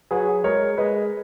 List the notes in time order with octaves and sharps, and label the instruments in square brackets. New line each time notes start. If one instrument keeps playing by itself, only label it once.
[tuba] F#3 [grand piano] G#4 B4
[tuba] G#3 [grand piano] A#4 C#5
[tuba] G#3 [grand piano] B4 D#5